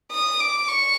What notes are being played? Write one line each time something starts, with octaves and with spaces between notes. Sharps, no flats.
D#6
D6
C#6